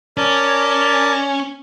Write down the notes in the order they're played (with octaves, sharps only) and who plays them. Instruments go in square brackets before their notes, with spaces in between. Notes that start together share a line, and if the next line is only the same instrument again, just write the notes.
[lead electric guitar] C#4 [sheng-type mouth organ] A#4 D5 A5